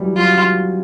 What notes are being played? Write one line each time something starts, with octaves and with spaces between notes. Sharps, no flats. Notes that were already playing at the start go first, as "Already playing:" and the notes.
Already playing: E3 F#3 G3
F#3 F4